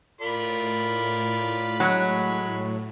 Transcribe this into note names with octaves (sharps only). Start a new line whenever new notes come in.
A2 F4 A#4 D5 B5
F#3 G#3 C#5